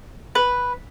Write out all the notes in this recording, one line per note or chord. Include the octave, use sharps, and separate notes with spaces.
B4